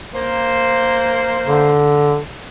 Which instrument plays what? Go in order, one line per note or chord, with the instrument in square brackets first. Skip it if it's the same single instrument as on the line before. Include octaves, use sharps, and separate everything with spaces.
[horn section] A#3 C5
[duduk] D3